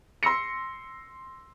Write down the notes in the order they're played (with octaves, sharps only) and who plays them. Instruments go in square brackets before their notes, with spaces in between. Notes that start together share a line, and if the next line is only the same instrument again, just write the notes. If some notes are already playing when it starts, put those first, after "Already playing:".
[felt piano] C6 E6 A#6 C#7